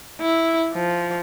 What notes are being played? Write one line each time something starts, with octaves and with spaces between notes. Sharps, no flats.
E4
F3